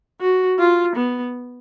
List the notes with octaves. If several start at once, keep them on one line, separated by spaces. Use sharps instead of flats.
F#4
F4
B3